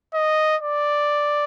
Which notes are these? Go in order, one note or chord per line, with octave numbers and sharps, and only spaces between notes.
D#5
D5